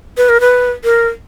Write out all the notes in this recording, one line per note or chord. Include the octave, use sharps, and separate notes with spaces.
B4
A#4
B4
A#4